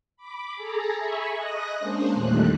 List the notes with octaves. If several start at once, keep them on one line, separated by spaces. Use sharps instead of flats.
B5 D6
G#4 A4 A#5
E5 G#5 B5 C#6
D#5 D#6 F#6 A#6
G#3 A#3 C#4 D4 C5
E2 A#2 D#3 G3 A3 F#6